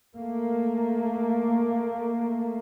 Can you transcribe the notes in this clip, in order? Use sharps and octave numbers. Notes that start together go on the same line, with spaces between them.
A3 A#3